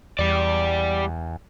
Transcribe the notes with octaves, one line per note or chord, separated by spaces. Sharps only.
E2 G3 D5